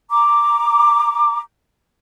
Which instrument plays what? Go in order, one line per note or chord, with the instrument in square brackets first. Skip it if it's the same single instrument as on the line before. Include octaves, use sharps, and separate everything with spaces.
[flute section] A#5 D6